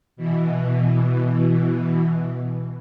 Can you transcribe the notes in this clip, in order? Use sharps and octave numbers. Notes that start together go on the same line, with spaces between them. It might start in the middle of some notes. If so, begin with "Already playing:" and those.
B2 E3